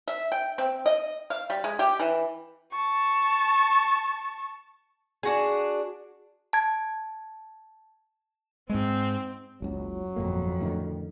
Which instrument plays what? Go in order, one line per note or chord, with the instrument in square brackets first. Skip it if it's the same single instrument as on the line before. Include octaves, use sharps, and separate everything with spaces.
[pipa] E5
G5
C4
D#5
F5
G3
G#3
G4
E3
[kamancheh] A5 C#6
[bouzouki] D4 F#4 G#4
[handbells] A5 G#6
[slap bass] G#2 G#3 [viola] C4
[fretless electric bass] F#1 C#2 [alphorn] F#3
[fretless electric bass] G1 A#2 A#3 [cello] F2
[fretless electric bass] A2 D3 D#3